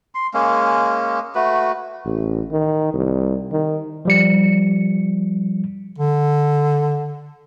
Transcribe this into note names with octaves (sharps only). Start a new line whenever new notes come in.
C6
G#3 A#3 C#4
A3 F#4 B4
A1
D#3
C2
D#3
F3 G3 C#7
D3